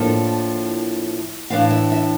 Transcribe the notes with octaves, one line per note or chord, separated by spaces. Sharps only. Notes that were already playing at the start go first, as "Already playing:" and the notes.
Already playing: A2 F3 A#3 D4 A4
A2 E3 A3 D4 F5
E5
E5